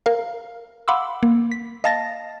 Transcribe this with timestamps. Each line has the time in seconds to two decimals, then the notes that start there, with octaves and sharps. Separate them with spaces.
0.06 A#4 F5
0.88 F5 F#5 B5 C6 D6 E6
1.23 A#3
1.52 B6
1.84 D#5 F5 A5 A6 A#6